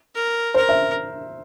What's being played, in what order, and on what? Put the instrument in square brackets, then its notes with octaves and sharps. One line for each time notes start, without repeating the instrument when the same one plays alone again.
[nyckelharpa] A#4
[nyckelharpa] A#4 [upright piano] C5
[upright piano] E5